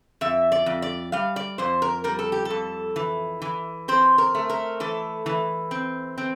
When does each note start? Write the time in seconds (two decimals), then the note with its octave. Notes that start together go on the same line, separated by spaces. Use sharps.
0.21 F2 E5
0.52 D5
0.66 F2
0.82 D5
1.12 G3 F5
1.36 D5
1.58 F2 C5
1.82 A#4
2.04 G3 A#4
2.19 A4
2.32 G4
2.45 A4
2.50 F2
2.96 E3
3.42 E3
3.88 C4 C5
4.18 A#4
4.35 A3
4.49 A#4
4.80 E3 A4
5.26 E3
5.71 C4
6.18 C4